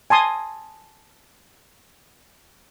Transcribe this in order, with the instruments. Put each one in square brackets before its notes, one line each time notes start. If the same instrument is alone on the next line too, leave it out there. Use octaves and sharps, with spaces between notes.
[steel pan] G#5 A5 C6 D#6